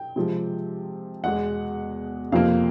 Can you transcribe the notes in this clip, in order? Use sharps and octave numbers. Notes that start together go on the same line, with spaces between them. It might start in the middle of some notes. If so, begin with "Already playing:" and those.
Already playing: G5
C3 F3 G#3
E2 B2 G#3 F#5
F2 C3 F3 A#3 F5